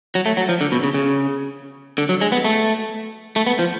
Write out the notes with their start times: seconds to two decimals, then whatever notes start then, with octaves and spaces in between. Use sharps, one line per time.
0.15 F#3
0.26 A3
0.37 F#3
0.49 F3
0.61 D3
0.72 B2
0.83 C#3
0.94 C#3
1.98 D3
2.09 F#3
2.21 G#3
2.32 B3
2.44 A3
3.36 A3
3.47 B3
3.59 F3